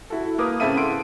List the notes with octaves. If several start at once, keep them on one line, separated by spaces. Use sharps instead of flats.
E4 F#4 A4
A#3 A#4 B4 D6 D#6
A2 C#3 C4 A4 E5 D#7
F#5 C6 D7